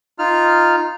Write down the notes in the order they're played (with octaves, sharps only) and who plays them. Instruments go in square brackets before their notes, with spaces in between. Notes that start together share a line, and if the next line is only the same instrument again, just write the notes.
[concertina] D#4 F4 F6